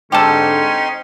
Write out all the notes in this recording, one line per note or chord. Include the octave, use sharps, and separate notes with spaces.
G#2 D3 C4 C#4 D#4 G4 A4 C6